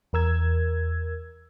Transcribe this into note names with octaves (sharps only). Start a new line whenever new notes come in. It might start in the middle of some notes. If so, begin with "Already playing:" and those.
E2 A#4 E6 G#6